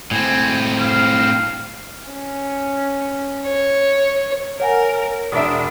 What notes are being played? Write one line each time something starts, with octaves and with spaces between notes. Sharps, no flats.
A2 C4 G#5
F5
C#4
C#5
A#4 C#5 F#5 G#5
E1 D4 E5 D#6